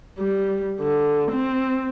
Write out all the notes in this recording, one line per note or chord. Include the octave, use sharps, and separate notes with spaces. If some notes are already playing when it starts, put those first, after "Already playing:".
G3
D3
C4